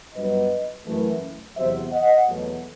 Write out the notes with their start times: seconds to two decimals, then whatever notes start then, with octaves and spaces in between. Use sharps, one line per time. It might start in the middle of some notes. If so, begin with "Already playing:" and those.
0.15 G2 F#3 B3 B4 D#5
0.86 F#2 E3 A3
1.56 E2 C3 F#3 C5 E5
1.92 D#5 F#5
2.27 E2 B2 F#3 A3